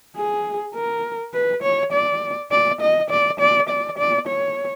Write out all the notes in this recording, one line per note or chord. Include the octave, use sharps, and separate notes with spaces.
G#4
A#4
B4
C#5
D5
D5
D#5
D5
D5
D5
D5
C#5